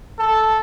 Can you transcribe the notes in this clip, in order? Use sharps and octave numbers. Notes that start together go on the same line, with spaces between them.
A4